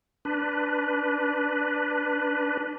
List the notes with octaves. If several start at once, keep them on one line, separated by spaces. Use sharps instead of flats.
D4 B4